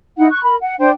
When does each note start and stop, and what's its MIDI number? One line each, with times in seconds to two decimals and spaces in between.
0.17 0.27 63
0.17 0.27 64
0.17 0.27 78
0.31 0.42 85
0.31 0.42 90
0.43 0.55 70
0.43 0.55 83
0.61 0.74 78
0.79 0.90 62
0.79 0.90 72
0.79 0.90 79